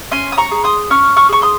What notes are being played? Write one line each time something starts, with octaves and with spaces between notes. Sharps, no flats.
C#4 G#5 C6
D#6
A#5 C#6
G#4
C6 D#6
C#4 C#6 F6
C#6 F6
G#4 C#6
C6 D#6